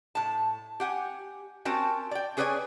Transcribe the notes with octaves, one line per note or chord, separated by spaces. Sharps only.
A2 A5
G4 F#5 G#5
C4 C#4 F#4 A#4 G5 A5
D5 G5
C#4 G#4 B4 C#5 D5 G#5